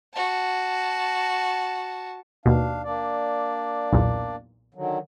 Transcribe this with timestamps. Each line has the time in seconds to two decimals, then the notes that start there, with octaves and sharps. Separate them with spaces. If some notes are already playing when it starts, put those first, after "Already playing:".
0.13 F#4 A5
2.46 D#2 B2 D4 F5
2.84 A#3 D4 D5
3.93 B1 E2 A#2
4.74 D3 D#3 F#3